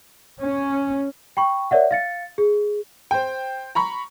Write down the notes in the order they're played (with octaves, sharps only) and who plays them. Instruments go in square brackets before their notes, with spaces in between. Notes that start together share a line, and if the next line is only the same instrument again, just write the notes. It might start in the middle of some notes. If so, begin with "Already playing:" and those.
[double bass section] C#4
[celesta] G5 B5 C#6
A#4 C#5 D5 E5 F#5
F5 A6 C#7
G#4
[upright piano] C5 G5
A#5 B5 C#6